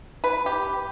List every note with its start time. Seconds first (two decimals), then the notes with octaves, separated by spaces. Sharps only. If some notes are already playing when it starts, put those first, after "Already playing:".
0.24 B4
0.46 G4